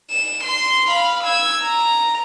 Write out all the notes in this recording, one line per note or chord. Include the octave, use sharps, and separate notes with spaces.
E7
C6
F5 B5
E6 G#6
A#5